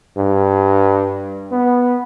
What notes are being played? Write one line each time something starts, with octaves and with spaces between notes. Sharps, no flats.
G2
B3